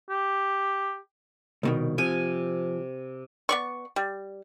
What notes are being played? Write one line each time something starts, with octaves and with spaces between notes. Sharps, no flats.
G4
C2 B2 D#3
C3 F3 G#5
B3 D5 C#6
G3